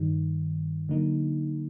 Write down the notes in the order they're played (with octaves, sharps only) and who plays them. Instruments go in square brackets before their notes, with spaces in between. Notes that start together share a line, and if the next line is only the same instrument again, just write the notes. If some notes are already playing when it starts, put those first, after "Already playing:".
Already playing: [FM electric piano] G2 D#3 G3
D3 F#3 A#3 D#4